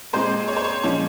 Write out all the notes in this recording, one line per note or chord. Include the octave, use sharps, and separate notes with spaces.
A#2 G#3 C4 C5
C#5
C5
C#5
A#2 F3 G#3 C#4 C#5